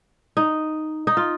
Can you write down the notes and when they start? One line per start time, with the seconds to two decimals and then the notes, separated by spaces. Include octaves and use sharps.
0.37 D#4
1.07 D#4
1.17 F4